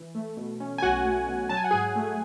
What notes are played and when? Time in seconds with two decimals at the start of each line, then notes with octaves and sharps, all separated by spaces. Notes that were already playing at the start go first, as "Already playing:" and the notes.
Already playing: E3
0.15 A3
0.37 B2
0.60 C#4
0.78 G#5
0.82 B1 F#4 F#5
1.05 A3
1.27 B2
1.49 F#3 A5
1.57 G#5
1.64 F#5
1.71 G#2 G#4 G#5
1.96 A3